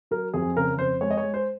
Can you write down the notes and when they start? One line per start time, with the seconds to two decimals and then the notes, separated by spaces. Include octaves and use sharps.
0.11 F#3 A#4
0.34 F2 G#4
0.57 C#3 A#4
0.78 F2 C5
1.01 G#3 C#5
1.11 D#5
1.17 C#5
1.23 G#3
1.34 C5